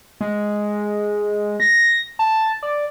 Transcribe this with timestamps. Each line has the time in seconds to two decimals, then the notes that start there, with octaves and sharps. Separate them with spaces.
0.21 G#3
1.60 A#6
2.19 A5
2.63 D5